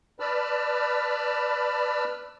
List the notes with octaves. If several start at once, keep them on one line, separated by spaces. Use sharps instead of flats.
B4 D5 A5 B5 E6 F6